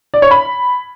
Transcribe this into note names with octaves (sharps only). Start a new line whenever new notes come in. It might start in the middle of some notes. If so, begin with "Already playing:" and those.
D5
C#5
B5